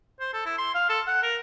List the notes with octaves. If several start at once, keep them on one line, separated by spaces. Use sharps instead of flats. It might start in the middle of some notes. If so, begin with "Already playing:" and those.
C5
A4
E4
C6
F5
A4
F#5
A#4